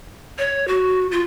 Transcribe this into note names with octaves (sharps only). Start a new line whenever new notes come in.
C#5
F#4
F4